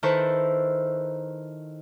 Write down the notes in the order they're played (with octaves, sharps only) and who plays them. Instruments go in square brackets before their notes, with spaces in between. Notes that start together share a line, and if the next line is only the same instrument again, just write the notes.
[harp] D#3 E4 A4 B4 C5 C#6